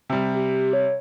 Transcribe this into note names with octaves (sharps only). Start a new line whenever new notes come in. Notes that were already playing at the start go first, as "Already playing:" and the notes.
C3 G3
G4
C#5